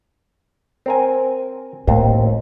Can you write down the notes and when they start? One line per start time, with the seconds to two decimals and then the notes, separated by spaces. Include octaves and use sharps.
0.86 C4 A#4 G#5
1.87 D#2 A2 A3 C4